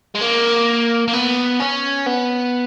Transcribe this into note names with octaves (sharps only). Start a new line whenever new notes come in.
G#3
A#3
A#3
B3
C#4
B3